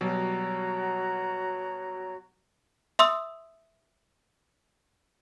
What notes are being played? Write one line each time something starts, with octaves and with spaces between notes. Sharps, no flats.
B2 F#3 G3 F#4 C#5 A#5
E5 C6 D#6 E6